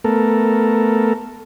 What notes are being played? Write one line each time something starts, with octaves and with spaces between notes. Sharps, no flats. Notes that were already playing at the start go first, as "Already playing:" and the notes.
A3 B3 A4 A#4